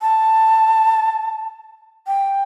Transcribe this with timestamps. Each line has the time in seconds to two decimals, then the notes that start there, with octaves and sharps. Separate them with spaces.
0.02 A5
2.07 G5